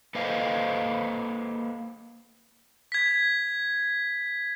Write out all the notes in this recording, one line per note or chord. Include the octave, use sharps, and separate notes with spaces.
A#3 A4 B4 C5 D#5 F5
G#6 B6